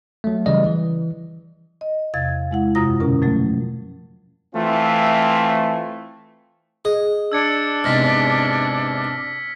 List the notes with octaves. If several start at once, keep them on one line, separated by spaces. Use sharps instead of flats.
F#3 A3
C#3 E3 G3 D5 D#5
E3
D#5
E2 C3 F5 G#6 A6
G#3 E4 F#5
F#2 C3 F4 A#5 D#6 A#6
B2 D3 C#4 A#4
F3 F#3 A3
E3 A3 C4 F4
G#4 D#5
D4 E6 G#6 C#7
E2 G#2 C3 F6 A#6 B6